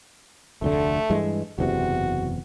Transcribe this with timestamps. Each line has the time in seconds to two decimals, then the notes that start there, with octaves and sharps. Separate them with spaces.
0.62 F1 D2 D3 A3
1.10 G2 E3 G#3
1.58 F#1 E2 C3 F#4